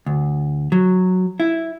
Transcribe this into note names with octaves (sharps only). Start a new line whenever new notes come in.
D2
F#3
E4